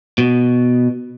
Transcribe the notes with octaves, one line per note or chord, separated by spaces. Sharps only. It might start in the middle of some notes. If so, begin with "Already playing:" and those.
B2